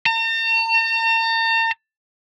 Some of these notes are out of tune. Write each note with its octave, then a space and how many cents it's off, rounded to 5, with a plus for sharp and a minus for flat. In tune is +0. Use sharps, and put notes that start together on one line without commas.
A#5 -45